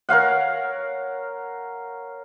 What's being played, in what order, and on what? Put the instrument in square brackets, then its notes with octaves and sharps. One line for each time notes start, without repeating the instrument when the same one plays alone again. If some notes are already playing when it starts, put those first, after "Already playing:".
[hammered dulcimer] A#4 C#5 F5 F#5